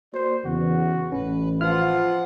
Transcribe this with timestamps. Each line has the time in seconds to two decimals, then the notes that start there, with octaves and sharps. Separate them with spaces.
0.14 A#3 F#4 C5 D5
0.45 E2 C#3 F#4
1.12 A1 C#4 B4
1.61 F3 F4 B4 F#5 F6